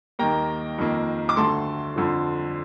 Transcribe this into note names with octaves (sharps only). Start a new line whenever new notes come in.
D#2 D#3 A#3 G5 A#5
F2 D#3 A#3
D6
D2 D3 A3 A5 C6
F2 D3 F3